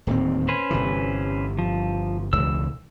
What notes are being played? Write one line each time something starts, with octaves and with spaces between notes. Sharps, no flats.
D1 D#2 C4
C#4 B4 C5
G1 C3 E3
F3
E1 C#2 E3 E6